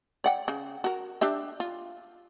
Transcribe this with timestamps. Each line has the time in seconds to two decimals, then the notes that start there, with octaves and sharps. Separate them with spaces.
0.24 D5 F#5 G5
0.48 C#3
0.84 F#4 A#4
1.21 D4 G4 E5
1.60 F4